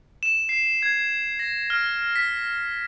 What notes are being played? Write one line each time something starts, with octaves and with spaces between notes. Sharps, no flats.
E7
C7
G#6
A#6
F6
B6